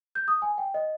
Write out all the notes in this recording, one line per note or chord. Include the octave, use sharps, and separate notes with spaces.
G6
D#6
G#5
G5
D#5